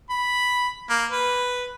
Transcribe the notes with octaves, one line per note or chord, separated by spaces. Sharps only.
B5
A#3
B4